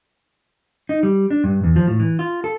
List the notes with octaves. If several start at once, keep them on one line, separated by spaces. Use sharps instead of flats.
D#4
G3
D4
G2
E2
F3
A2
E3
F4
A4